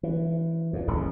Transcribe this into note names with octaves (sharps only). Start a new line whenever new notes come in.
E3
F2 A#2
D#1 A1 F2 C#3